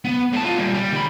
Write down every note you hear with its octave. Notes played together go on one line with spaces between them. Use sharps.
B3
A2 A5
F4 D#5
A#2 G3
G3
D#3 B5